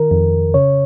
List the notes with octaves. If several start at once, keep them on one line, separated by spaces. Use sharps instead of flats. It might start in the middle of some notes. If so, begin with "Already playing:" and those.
Already playing: D#3 A#4
F2
C#3 C#5